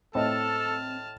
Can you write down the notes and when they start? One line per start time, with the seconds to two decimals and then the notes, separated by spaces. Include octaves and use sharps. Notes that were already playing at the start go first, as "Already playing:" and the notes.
0.15 A2 C4 A4 D#5 A5 F6